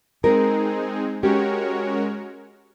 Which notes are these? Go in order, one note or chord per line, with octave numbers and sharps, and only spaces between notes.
G#3 C4 D#4 G#4 A#4
G#3 C#4 F#4 G4 A#4 C#5